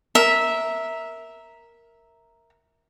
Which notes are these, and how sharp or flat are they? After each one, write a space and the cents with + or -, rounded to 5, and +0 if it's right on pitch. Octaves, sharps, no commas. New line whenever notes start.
A#4 +0 E5 -10